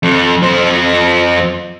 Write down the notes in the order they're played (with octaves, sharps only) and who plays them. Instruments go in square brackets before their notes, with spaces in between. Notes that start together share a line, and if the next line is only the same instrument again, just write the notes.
[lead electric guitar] F2
F2 C5